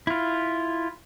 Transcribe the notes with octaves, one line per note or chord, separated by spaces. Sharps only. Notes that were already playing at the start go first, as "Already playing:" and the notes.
E4 F4